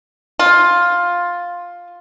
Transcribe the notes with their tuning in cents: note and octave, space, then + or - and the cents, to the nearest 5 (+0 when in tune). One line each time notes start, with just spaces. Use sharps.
F4 +10